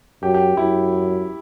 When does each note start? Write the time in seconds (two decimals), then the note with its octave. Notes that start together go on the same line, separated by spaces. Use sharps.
0.22 F#2 G4
0.34 G4
0.57 F#2 E4